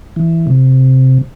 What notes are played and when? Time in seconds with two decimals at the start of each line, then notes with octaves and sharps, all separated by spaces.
0.16 E3
0.47 C3